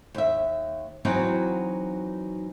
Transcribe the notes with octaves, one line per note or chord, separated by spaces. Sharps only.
D#2 E5
E3 F#3 C4 D#4 F#4